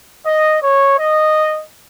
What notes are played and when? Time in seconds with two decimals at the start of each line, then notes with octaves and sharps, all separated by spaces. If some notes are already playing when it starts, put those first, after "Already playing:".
0.26 D#5
0.63 C#5
0.98 D#5